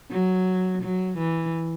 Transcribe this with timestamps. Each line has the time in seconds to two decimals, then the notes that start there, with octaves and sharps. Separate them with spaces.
0.10 F#3
0.82 F#3
1.18 E3